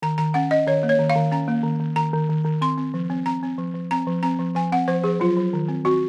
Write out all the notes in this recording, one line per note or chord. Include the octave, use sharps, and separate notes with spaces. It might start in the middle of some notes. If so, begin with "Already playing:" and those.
D#3 A#5
D#3 A#5
C#4 F#5
C#4 D#5
D#3 C#5
A#3
C#5
D#3
F5
D#3
C#4 A#5
A#3
D#3
D#3
D#3 A#5
D#3
D#3
D#3
C4 C6
C4
F3
C4
C4 A#5
C4
F3
F3
C4 A#5
F3
C4 A#5
F3
F3 G#5
C4 F#5
F3 C5
F3 G#4
F#3 F4
F#3
D#3
C4
C4 F#4